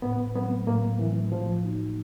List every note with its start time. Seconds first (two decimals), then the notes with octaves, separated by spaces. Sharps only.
0.02 A2 B3
0.34 F#3 A3 B3 C4
0.67 A2 A#3
0.99 E3 F#3 A3 C4
1.32 A2 F3
1.63 F3 A#3 D#4 F#4